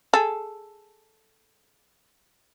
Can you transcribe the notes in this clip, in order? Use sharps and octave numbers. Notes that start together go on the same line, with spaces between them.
G#4 A4